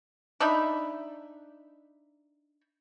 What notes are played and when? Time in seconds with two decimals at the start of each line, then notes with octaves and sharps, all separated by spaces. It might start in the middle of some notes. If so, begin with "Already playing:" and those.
0.40 D4 D#4 E5 B5